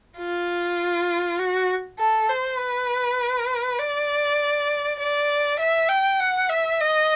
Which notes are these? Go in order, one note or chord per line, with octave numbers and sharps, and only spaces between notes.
F4
F#4
A4
C5
B4
D5
D5
E5
G5
F#5
E5
D#5